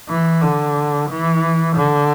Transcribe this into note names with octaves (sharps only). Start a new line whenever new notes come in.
E3
D3
E3
D3